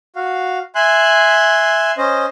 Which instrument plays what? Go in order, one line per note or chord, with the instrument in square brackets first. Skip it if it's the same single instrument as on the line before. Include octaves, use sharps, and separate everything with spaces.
[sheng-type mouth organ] F#4 F5
E5 G#5 C6 F#6
C#4 C5 D#5